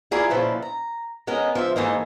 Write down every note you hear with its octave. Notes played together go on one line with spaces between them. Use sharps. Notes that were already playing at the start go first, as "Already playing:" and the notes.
E4 F4 G#4 A#4 D5
A#2 C#3 F3 E4 B4
A#5
G#3 B3 C#4 A#4 D#5
F3 C5 E5
G#2 E3 A3 A#3 D#5